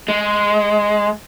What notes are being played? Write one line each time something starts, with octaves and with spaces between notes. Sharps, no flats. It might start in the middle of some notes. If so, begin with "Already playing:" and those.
G#3